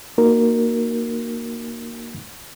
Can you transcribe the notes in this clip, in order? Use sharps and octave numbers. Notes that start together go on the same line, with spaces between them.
A#3 D#4 F#4 A#4